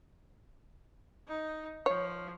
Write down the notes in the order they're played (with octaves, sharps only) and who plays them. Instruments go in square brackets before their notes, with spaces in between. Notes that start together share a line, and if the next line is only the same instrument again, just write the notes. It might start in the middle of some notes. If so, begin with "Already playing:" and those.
[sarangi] D#4
[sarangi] F3 [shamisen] C#5